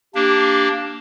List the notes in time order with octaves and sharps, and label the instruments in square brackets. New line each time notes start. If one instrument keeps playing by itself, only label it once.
[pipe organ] A#3 D4 [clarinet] G4